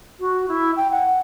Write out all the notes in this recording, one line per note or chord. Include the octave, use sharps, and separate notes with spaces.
F#4
E4
G5
F#5